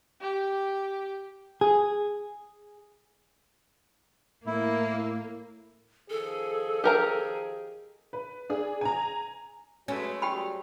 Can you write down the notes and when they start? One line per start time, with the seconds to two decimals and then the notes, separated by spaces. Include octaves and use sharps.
0.21 G4
1.61 G#4
4.46 A2 A#3 E4
6.10 D#3 F3 G#4 A4
6.84 G4 A#4 A#5
8.13 B4
8.50 D4 G#4
8.81 G#5 A#5
9.88 F#3 G#3 A3 C#4 F#4 B4
10.22 F#3 G3 G4 G5 B5